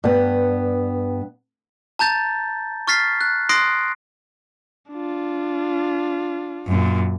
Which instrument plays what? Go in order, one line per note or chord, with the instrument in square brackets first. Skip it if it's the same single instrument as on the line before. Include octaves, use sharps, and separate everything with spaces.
[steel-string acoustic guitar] G2 B3
[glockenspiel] A5 A#5 G6 A6
C#6 F6 A6 B6 C7
F#6
C6 D#6 F#6 A#6 C7 D7
[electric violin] D4 F4
[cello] F#2 A#2